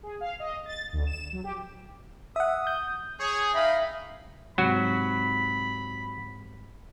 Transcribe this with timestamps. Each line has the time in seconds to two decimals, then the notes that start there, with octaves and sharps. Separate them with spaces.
0.03 G#4
0.21 F5
0.40 D#5
0.66 A6
0.93 D2
1.07 E7
1.33 F#3
1.44 G4
2.36 E5 F#5 D#6
2.67 G6
3.20 G#4 C#5
3.54 D#4 E5 F5 G5 B5
4.58 G#2 C3 F#3 F#4 B5